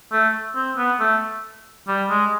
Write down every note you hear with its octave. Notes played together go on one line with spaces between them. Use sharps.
A3
C4
B3
A3
G3
G#3